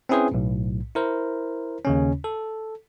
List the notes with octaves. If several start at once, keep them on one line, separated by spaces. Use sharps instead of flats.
C4 C#4 E4 G#4 B4 C5
B1 A2
E4 A#4 C5
D#2 C#3 C#4
A4